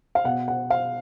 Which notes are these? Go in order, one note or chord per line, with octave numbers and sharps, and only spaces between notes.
F5
B2 F#5
F#5
F5